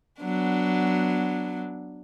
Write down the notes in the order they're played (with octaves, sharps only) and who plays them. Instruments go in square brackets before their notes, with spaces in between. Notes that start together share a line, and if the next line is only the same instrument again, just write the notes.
[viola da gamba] F#3 B3 D4